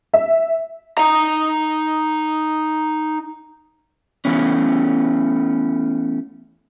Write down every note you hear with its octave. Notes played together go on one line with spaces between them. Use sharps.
E5
D#4 A#5
E3 A3 B3 C#4